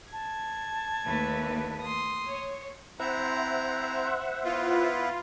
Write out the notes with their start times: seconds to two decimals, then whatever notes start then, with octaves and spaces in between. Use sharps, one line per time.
0.13 A5 G#6
1.05 D#2 A3 B4
1.82 C6 D#6
2.27 C#5
2.99 C4 E4 C5 E5 F#5 A#5
4.44 B3 E4 F4 B4